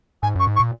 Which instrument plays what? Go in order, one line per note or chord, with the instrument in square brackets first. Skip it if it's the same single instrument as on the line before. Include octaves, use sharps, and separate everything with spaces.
[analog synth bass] G#2 [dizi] G#5
[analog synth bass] F#2 [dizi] C#6
[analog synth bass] G#2
[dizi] C#6
[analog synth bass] A#2